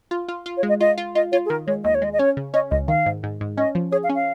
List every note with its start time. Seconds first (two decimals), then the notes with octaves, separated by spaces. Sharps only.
0.11 F4
0.28 F4
0.46 F4
0.57 C#5
0.63 G#3
0.69 D#5
0.81 F4 D#5
0.98 F4
1.15 F4 D#5
1.32 F4 C#5
1.46 G#4
1.50 D#3 A#4
1.67 G#3 C#5
1.84 D#2 D#5
1.95 C#5
2.02 G#3 D#5
2.13 D#5
2.19 C#4 C#5
2.37 C#3
2.54 C#4 D#5
2.71 C#2 D#5
2.88 D#3 F5
3.06 G#2
3.23 G#2
3.41 G#2
3.57 C#4 D#5
3.75 F3
3.92 G#4 C#5
4.04 F5
4.09 C#4
4.15 F5